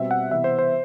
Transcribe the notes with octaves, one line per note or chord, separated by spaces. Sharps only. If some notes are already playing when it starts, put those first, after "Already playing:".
Already playing: B2 G3 C4 E5
F#5
C3 E3 B3 E5
C5
C5